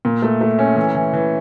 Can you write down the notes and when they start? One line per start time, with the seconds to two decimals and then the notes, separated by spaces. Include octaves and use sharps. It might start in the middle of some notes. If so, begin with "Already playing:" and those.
0.05 A#2
0.22 A3
0.41 A3
0.59 C#4
0.76 E3
0.95 E3
1.13 E3